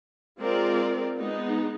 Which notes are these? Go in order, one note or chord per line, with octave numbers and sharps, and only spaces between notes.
G#3 C4 F4 A#4 D5
G#3 B3 D#4